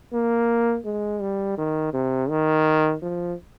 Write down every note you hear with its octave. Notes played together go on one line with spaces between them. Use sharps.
A#3
G#3
G3
D#3
C3
D#3
F3